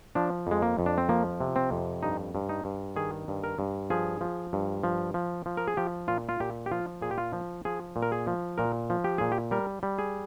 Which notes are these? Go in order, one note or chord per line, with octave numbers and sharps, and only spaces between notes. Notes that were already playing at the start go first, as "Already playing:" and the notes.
F3 D4
F2 G#3
A#3
F2
D4
C4
F3 A#3
C3
C4
F2
G2 D#4
G2
D#4
G2
D#3 G#4
G2
A#4
G2
F3 G#4
F3
G2
F3
F3
F3
A#4
G#4
F3 G4
A#2 F4
F4
A#2 G4
G4
F3 F4
A#2 G#4
G4
F4
F3
F3 G#4
A#2
A#4
G#4
F3
A#2 A#4
F3
G4
A#2 G#4
G4
G3 A#4
G3
G#4